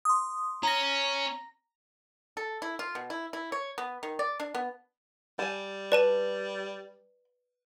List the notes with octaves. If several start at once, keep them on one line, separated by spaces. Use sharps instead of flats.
C6 D#6
C#4 A#5 A#6
A4
E4
F4
B2
E4
E4
C#5
B3
D#3
D5
D4
B3
G3 G#5 A5
B4 D5 A5 D#7